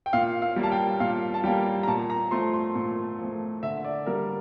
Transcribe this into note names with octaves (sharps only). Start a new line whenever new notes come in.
G5
A#2 F5
F5
G3 A#3
A5
G5
A#2 F5
A5
G3 A#3 G5
A#5
A#2 A5
A#5
F3 A3 C6
C6
A#2
F3
A3
D3 E5
D5
G3 A#3 A#4